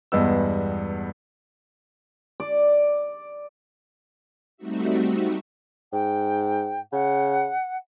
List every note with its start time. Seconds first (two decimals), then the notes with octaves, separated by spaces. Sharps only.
0.12 E2 G2 G#3 B3 E6
2.40 D5
4.57 G3 A3 C4 D#4 F#4 E5
5.93 G#2 G5
6.93 C#3 F#5